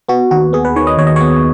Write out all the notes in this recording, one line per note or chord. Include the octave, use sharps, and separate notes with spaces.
B3 F#4
D#2 F#4
B3 G#4
B4
D#3 C#5
D#5
D#2 C#5
D#5
B3 C#5